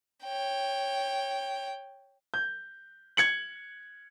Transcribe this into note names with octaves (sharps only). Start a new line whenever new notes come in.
C#5 G5
G6
G#6 C#7 F#7